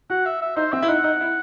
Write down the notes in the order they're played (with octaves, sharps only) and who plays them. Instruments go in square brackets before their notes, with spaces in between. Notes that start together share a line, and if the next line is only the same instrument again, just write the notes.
[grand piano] F#4 [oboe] F#5
[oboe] E5
E5
[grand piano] D#4 [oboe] C5
[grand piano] C4 [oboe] E5
[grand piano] E4
[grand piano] D#4 [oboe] F#5
[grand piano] D#4
E4